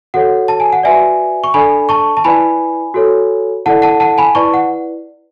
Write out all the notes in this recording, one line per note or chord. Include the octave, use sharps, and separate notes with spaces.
F#4 A4 C#5 F#5
A5
G#5
F#5
F#4 B4 D5 E5 G#5
C#6
D4 A4 D5 G#5 B5
A5 C#6
A5
E4 B4 D5 G#5 B5
F#4 A4 C#5
E4 A4 D5 F#5 A5
F#5 A5
F#5 A5
G#5 B5
E4 B4 D5 A5 C#6
F#5